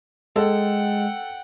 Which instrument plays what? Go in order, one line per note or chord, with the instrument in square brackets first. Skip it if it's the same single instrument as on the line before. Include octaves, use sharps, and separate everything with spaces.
[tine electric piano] G#3 [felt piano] A4 [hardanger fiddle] F#5 G5